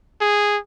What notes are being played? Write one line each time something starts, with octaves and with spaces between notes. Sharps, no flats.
G#4